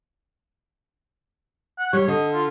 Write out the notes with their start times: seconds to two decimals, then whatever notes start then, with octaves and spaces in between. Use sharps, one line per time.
1.79 F#5
1.93 G3 C#5
2.08 D3 D#5
2.33 F4